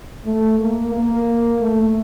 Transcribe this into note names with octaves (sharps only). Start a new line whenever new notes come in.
A3
A#3
A#3
A3